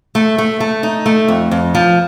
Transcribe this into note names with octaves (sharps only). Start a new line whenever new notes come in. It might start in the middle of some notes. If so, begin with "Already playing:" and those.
A3
A3
A3
D#4
A3
F2
F2
F3